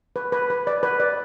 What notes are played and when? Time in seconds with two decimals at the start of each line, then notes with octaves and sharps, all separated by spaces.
0.16 B4
0.32 B4
0.50 B4
0.67 D5
0.83 B4
1.00 D5